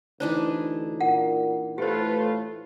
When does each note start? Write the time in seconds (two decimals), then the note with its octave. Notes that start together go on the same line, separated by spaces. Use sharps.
0.20 D2 E3 D4 D#4 C5
1.01 A#2 F#5
1.78 A2 A3 F4 G4 B4 C5